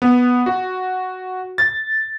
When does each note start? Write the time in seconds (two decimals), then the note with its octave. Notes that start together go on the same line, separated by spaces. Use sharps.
0.02 B3
0.46 F#4
1.58 A6